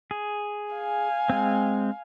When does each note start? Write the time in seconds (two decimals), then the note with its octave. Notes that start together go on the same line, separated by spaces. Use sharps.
0.11 G#4
0.72 F5 G#5
1.30 G#3 C4